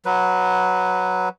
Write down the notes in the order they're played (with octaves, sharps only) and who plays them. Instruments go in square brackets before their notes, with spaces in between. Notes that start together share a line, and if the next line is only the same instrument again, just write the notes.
[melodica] F#3 B4